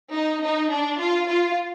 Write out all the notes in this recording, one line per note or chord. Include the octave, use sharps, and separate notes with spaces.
D#4
D#4
D4
F4
F4